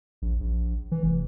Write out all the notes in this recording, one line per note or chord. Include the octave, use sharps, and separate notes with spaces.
A#1
A#1
E3
F1